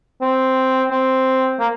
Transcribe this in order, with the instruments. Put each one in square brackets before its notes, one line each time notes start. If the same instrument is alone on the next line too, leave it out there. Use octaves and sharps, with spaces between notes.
[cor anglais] C4
C4
A#3